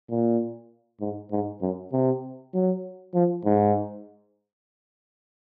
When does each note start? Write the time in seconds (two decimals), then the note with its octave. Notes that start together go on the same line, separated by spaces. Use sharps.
0.10 A#2
1.00 G#2
1.31 G#2
1.61 F#2
1.92 C3
2.54 F#3
3.14 F3
3.45 G#2